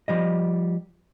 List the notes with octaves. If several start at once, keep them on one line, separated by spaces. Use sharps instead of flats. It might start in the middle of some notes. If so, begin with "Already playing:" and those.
F3 G3 D#5